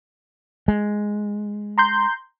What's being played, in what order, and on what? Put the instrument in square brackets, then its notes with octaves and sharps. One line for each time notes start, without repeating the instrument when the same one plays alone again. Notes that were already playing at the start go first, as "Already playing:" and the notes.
[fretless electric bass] G#3
[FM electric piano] A#5 C6 G6